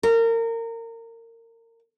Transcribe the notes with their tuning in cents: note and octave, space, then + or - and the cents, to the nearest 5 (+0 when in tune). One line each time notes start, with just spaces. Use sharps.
A#4 -25